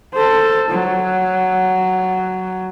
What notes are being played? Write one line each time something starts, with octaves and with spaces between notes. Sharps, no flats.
A4 C5
F#3